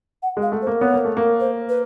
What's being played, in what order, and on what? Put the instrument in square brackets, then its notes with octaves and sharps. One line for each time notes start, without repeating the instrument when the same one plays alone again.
[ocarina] F#5
[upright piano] G#3
[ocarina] F5
[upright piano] A3
[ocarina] C5
[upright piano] A#3
[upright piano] B3 [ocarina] C#5
[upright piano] A#3
A3
A#3
[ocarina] C5
B4